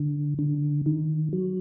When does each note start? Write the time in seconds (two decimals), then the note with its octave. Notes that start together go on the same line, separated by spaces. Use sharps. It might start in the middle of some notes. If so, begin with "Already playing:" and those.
Already playing: D3
0.39 D3
0.86 D#3
1.33 F#3